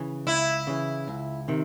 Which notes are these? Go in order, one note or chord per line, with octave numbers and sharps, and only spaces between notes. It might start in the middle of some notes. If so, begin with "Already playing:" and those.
Already playing: C#3 E3
C#2 E4
C#3 E3
C#2
C3 D#3